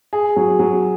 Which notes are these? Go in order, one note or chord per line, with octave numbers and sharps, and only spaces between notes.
G#4
F#3
F#3